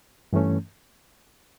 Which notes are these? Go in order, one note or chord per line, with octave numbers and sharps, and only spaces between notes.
G2 E3 A3 C#4